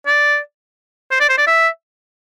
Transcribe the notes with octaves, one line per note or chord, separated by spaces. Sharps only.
D5
C5
D5
C5
D5
E5